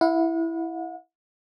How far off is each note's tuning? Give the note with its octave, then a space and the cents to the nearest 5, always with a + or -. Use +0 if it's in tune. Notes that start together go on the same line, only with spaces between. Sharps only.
E4 +0 F#5 -40